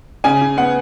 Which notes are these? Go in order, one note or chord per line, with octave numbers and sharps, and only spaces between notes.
C#3 G#5
C#3
B3 F#5